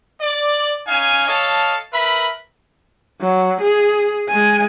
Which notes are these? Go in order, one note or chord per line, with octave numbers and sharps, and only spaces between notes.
D5
C#4 D#4 F5 G#5
A4 C#5 D#5 F5 A5
A#4 B4 E5 B5
F#3
G#4
G#3 G#5